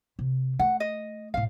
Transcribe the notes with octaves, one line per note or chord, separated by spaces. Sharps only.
C3
A3 F#5
D#5
E1 A2 F5